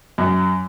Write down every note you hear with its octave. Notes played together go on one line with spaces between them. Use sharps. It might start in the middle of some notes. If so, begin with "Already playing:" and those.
F#2